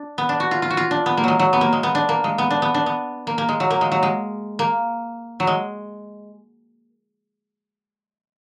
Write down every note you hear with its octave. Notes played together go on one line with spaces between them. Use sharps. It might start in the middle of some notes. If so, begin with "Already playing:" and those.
Already playing: D4
B3
D4
F#4
F4
F4
F#4
F4
D4
B3
A#3
F#3 G#3
F#3
B3
A#3
G#3
B3
D4
A#3
G#3
B3
D4
B3
D4
B3
A#3
A#3
G#3
F#3
A#3
G#3
F#3
G#3
A#3
F#3
G#3